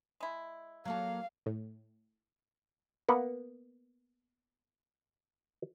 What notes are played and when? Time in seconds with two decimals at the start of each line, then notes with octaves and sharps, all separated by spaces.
0.20 G#3 E4
0.85 F#3 A#3 A4 F5
1.46 A2
3.09 A#3 B3 F#5